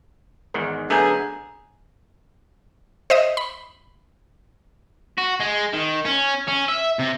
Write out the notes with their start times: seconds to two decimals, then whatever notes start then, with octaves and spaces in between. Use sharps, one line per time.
0.54 E2 G#2 D#3
0.90 D3 F#3 A3 B3 G#4 G#5 A#5 G6
3.10 C5 D#5 E5 D#6
3.37 B5
5.18 F#4
5.40 G#3
5.73 D#3
6.05 C#4
6.48 C#4
6.68 E5
6.99 C3